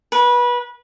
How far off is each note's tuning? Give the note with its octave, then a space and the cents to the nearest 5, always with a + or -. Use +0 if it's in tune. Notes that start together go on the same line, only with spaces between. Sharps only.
B4 -25